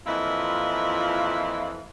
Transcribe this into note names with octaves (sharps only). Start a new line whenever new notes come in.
F2 A#2 E3 E4 F4 D#5